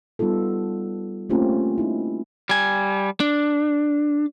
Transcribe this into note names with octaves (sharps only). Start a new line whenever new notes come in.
G3 B3 D#4 F4 A4
A3 A#3 C4 C#4 F4 G4
D#4 E4
G3 G#5
D4